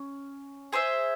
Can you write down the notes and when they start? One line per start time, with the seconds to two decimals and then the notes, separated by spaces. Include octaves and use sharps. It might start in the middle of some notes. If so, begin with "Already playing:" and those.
Already playing: C#4
0.73 G#4 C5 E5